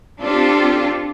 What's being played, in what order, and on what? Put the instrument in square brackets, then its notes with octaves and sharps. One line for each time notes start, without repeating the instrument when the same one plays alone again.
[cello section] C4 D4 F4 G4 A4